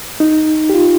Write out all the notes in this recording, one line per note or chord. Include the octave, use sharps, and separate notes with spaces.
D#4
G4
F4